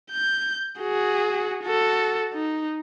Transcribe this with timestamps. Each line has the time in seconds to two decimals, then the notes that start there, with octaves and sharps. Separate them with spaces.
0.11 G6
0.80 F#4 G#4
1.63 F#4 A4
2.34 D#4